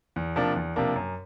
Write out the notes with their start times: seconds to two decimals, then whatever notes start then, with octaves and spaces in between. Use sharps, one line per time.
0.16 E2
0.36 C3 F3 A#3 D4
0.56 E2
0.76 C3 F3 A#3 D4
0.96 F#2